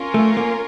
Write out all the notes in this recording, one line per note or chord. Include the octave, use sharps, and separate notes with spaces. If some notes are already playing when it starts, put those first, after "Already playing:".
Already playing: C#4 F4 A#4
A3
A#3